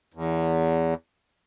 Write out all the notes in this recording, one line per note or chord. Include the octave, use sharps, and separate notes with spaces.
E2